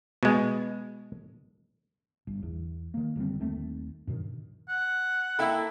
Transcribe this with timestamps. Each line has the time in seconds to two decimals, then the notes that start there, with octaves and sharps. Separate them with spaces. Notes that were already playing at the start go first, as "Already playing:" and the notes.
0.23 B2 G#3
2.27 G1
2.43 E2
2.94 D#3 A#3
3.16 F#1 D3 G3 C4
3.39 D#1 D#2 A3 C4
4.07 G2 B2 D#3 F#3
4.68 F#5
5.39 A#3 E4 A4 E5 G5 B5